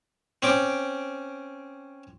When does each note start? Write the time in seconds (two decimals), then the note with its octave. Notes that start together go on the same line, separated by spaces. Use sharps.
0.42 C4 C#4 D6